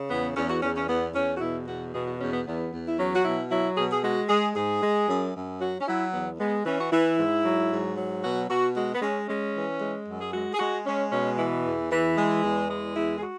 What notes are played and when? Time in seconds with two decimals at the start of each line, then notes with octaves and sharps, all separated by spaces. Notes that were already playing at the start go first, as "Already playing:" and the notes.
Already playing: C#3
0.10 E2 B3
0.37 E2 C#4
0.50 F#4
0.63 E2 C#4
0.76 C#4
0.89 E2 B3
1.15 E2 C#4
1.37 F#4
1.41 B2 E4
1.67 E2 F#4
1.94 B2 G#4
2.07 F#4
2.20 E2 C#4
2.33 B3
2.46 E2 B3
2.73 E2
2.88 E4
2.98 F#3 C#4
3.16 F#4
3.25 B2 E4
3.51 F#3 E4
3.77 B2 G#4
3.93 G#4
4.04 G#3 F#4
4.29 G#3 G#4
4.56 G#2 G#4
4.82 G#3
5.09 F#2
5.35 F#2
5.61 F#3 F#4
5.81 C#4
5.87 F#3 E4
6.13 E2 B3
6.39 G#3 B3
6.66 E3 C#4
6.81 F#4
6.92 E3 E4
7.19 G#2
7.45 F#3
7.71 G#2
7.97 F#3
8.23 B2 F#4
8.50 B2 F#4
8.77 G#3 F#4
8.95 B3
9.02 G#3 C#4
9.28 G#3 C#4
9.55 E3
9.81 G#3
10.07 F#2
10.21 G#4
10.33 G#3 F#4
10.54 G#4
10.59 G#3 F#4
10.86 G#3 C#4
11.12 B2 C#4
11.39 E3
11.65 E2
11.92 E3
12.17 G#3
12.44 E2
12.70 G#3
12.95 E2 E4
13.17 G#4
13.22 F#4